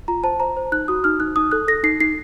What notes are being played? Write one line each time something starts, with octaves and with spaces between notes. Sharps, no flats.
F4 A#5
C5 A5
C5 A#5
C5
D#4 F#6
F#4 D#6
D#4 F6
D#4 F#6
D#4 D#6
A4 F#6
A4 A#6
D#4 C7
D#4 C7